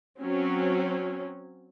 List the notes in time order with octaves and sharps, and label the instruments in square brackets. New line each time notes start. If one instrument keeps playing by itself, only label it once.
[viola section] F#3 C4 C#4 F#4